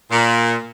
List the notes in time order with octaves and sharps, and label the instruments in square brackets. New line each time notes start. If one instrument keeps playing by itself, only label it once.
[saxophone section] A#2